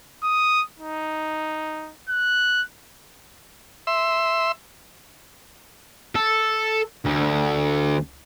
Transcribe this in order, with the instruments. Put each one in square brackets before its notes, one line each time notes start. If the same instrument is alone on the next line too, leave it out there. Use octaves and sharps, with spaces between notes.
[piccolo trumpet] D#6
D#4
F#6
[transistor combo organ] E5 C6 E6
[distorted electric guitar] A4
D2